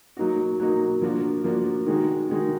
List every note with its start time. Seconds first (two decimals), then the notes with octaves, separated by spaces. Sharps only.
0.17 F#3 A#3 D#4 F#4
0.60 F#3 A#3 D#4 F#4
1.02 F3 A#3 D4 F#4
1.44 F3 A#3 D4 F#4
1.86 D#3 G#3 D#4 F#4
2.29 D#3 G#3 D#4 F#4